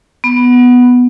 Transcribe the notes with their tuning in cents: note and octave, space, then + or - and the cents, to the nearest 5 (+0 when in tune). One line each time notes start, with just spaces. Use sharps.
B3 +0